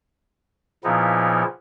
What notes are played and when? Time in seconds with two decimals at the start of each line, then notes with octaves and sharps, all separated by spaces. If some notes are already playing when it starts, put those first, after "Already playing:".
0.84 A#2 C#3 F3 B3 D#4 E4